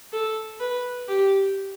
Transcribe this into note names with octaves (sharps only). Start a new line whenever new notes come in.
A4
B4
G4